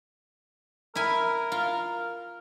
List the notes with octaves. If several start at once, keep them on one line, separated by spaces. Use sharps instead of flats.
E4 A#4 G#5
F4